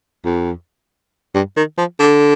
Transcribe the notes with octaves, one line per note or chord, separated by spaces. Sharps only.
F2
G2
D#3
F3
D3